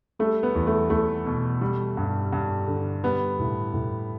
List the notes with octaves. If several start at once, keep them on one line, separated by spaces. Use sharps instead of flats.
G3 A3
B3
E2
A3
E2 A3
B2
G3
G2
G2
D3
G3 B3
A2
A2